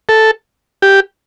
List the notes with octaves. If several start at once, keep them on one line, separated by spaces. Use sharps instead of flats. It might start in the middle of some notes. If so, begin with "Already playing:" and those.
A4
G4